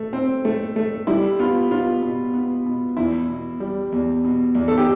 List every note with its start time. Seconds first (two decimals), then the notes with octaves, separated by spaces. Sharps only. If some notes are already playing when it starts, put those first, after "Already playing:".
Already playing: A3
0.13 C4
0.45 A3
0.76 A3
1.07 G3 E4
1.39 B3 F4
1.71 B3 F4
2.02 B2
2.33 B3
2.66 B2
2.97 E2 E4
3.29 B2
3.60 G3
3.92 E2
4.24 B2
4.55 E2
4.68 A4
4.78 G4